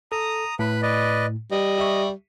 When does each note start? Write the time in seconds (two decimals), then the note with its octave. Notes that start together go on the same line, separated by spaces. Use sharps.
0.12 A4 A#5 D#6
0.59 A2 B4 B5
0.83 B4 D5 D#5
1.51 G3 D#5
1.78 G4 E5 C#6